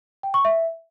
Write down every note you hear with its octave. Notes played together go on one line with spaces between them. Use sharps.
G5
C#6
E5